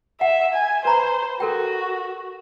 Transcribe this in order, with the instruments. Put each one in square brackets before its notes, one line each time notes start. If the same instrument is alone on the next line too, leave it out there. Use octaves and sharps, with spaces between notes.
[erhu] E5 [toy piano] F#5
[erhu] G#5
[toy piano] B4 A#5 B5 [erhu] C5
[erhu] F#4 [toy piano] A4 A#4 G5